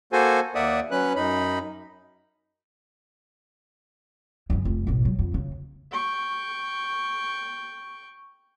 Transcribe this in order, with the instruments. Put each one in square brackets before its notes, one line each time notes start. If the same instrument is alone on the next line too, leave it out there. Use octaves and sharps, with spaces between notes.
[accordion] A#3 F#4 A4 C5 G#5
D#2 A#3 D5 E5 F#5 D#6
F#3 C#4 B4 F#6
F#2 D#4 B5
[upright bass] F#2 C#3
F1
A1 B2
F#3
F2 D3
C#3
[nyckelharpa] G5 C#6